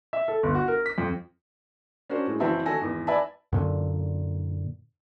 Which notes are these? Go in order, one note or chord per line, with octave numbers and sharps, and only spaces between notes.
E5
A4
G1
F#4
A#4
B6
F2
C#4 D4 F#4 A#4 C5
A2 G#3
F#1 E3 C4 F#4 E5 A5
D#3 F#4 A4 G#5 A#6
G#1 E2
B4 D5 E5 G#5 A5 B5
F#2 A#2 D3